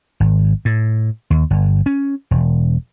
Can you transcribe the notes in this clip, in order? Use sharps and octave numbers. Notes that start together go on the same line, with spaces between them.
G#1
A2
D#2
G1
C#4
E1